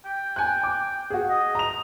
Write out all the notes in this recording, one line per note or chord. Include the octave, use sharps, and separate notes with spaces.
G5
G#5 F#6
D6
F#4 G#4
D#5
A#5 F7